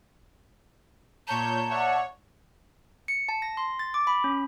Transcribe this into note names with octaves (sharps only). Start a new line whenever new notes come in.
A#2 C#5 A5 A#5 G6
C#5 D5 E5 F#5
C#7
A5
A#6
C6
A6
D6
B5
C#4